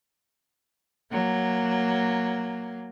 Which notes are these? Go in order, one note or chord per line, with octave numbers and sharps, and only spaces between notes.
F#3 A#3